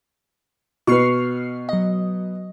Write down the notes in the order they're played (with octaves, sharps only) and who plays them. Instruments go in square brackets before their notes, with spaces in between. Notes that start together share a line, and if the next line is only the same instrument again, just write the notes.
[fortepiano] B2 B4 [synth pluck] C#6 F6 C7
[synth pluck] F#3 D#5